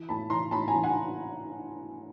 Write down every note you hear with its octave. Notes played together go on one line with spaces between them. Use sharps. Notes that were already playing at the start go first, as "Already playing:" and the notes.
Already playing: E3
A2 A5 B5
E3 A#5 C6
A2 A5 B5
G#5 A#5
E3
F#5 G#5